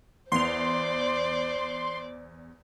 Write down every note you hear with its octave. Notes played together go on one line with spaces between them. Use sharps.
E2 C5 D5 C6 F7